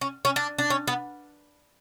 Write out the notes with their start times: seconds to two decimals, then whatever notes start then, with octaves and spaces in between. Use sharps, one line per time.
0.01 C#4
0.25 C#4
0.36 D4
0.59 D4
0.70 C#4
0.88 B3